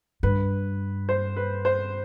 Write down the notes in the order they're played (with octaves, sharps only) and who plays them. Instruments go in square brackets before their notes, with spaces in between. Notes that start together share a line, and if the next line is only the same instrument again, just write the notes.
[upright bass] G2 [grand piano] B4
[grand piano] C5
B4
C5